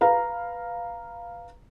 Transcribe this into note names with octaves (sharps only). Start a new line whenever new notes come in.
B4 F5 A#5